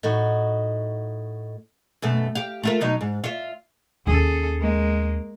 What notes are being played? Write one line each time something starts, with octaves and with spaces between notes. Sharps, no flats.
A2 D#4 F#4
F#2 B2 A3
G4 F5
A3 F4 A#4
B2 F#3 D#4
G#2
F4 E5
D#2 C#4 G#4 A4
G#3 A#3